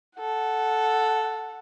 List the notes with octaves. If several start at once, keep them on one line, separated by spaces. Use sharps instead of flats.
A4 F#5